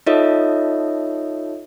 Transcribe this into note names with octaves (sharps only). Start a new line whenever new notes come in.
D#4 F4 A4 C#5 D#5 E5